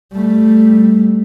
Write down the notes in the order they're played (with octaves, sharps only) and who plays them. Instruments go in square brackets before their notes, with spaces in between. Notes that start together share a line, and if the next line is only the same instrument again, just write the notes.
[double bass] G3 A3